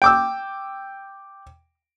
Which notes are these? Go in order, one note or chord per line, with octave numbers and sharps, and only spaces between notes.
G5 D6 E6